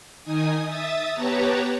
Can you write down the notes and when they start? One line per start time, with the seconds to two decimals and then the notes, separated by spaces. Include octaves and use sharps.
0.23 D#3 D#4 G#5 D#6
0.66 E5 D#6 A6
1.12 B3 G4 B4 C#5 A5 A#5